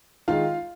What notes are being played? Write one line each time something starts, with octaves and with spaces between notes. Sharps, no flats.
D#3 G#3 F4 F5